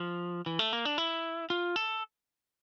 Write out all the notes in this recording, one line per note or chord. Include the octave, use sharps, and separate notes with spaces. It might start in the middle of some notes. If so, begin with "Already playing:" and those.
Already playing: F3
E3
A3
A#3
D4
E4
F4
A4